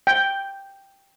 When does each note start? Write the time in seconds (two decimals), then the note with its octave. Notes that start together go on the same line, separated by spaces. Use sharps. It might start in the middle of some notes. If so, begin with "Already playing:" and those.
0.07 G5